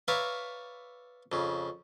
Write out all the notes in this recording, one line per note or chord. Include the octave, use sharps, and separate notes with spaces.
B4 C#5 D5 E5 F5 A#5
F2 C#3